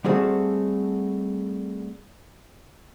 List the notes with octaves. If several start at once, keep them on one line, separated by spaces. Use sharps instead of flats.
G3 A3 C4 F#4 G#4 A4